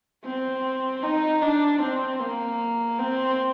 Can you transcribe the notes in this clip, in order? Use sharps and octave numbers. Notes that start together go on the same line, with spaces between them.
C4
D#4
D4
C4
A#3
C4